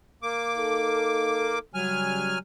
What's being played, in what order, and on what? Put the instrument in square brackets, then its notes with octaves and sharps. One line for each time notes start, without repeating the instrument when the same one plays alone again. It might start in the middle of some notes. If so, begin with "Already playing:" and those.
[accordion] A#3 D6
[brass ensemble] D#4 A4
[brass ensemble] C#3 G3 [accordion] F#3 G#5 F6